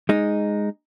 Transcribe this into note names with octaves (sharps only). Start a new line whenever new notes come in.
G#3 D#4